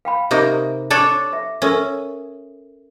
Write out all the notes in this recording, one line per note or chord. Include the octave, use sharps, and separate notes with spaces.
F5 G5 B5
C3 A#3 D#4 G4 E5
D4 A4 C#5
E5
C#4 A4 A#4 E5